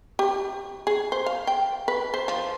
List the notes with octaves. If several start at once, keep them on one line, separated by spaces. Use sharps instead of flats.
G4
G#4
C5
F5
G5
B4
C5
F3